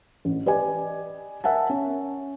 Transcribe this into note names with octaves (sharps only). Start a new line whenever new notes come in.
A1
G4 B4 D5 D#5 G#5
A#4 E5 F#5 G#5 A5
C#4